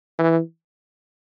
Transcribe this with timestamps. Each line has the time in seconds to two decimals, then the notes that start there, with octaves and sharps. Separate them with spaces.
0.19 E3